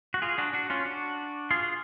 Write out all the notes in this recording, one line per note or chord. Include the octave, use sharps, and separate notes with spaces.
F#4
F4 G#4
D4 F#4
D4 F#4
C#4 F4
D4 F#4
F4 G#4